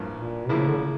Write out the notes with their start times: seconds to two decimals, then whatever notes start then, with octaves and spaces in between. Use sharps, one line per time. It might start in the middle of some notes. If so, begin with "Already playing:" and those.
Already playing: A1 G2 F3 A#3
0.14 A#2
0.49 A1 A2 C#3 F3 A#3 E4
0.69 D3
0.77 C#3